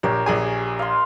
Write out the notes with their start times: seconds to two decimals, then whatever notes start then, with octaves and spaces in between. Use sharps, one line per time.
0.03 A#1 G4 A#4 C#5
0.26 A#1 G#4 G#5
0.79 F5 C6